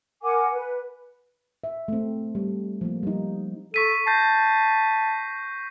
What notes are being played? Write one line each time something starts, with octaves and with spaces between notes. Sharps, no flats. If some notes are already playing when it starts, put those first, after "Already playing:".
A#4 F#5 G#5 D6
B4
E5
A3 C4
G3
F3 A#3
G3 D#4
A4 C#6 B6 D#7
A5 G6 A#6 C7